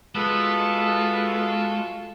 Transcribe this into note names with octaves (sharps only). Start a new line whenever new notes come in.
G#3 B3 F4 F#4 A4